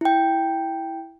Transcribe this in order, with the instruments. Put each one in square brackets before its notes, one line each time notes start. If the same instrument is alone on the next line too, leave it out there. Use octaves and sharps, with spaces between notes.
[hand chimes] E4 G5